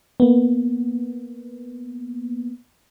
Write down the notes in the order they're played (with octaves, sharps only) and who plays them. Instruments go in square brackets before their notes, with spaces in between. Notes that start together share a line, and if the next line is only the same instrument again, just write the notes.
[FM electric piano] A#3 B3